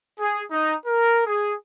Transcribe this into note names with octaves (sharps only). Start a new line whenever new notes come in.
G#4
D#4
A#4
G#4